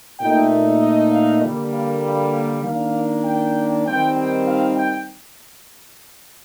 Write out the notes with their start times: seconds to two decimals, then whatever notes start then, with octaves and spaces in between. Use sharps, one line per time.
0.19 A#2 A3 D#4 G5
0.81 D#5
1.11 F5
1.42 D3 G3 A#3
1.72 F5
2.03 F5
2.33 F5
2.63 D#3 A#3 D4 F5
3.24 G5
3.85 D#3 G3 C4 G5
4.16 G5
4.46 F5
4.76 G5